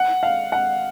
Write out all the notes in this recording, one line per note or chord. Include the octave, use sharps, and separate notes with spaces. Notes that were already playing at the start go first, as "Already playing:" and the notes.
Already playing: F#5
F5
F#5